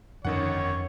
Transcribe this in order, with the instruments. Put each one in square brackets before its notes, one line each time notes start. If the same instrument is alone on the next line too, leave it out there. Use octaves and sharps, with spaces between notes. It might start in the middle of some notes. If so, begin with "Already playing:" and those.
[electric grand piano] G1 D#3 F#5 [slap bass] F2 C#4 [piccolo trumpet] C#5